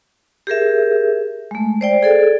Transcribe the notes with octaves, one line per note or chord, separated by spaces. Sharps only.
G4 G#4 A#4 E5
G#3 A3
C5 D5 G5
G#4 A4 D5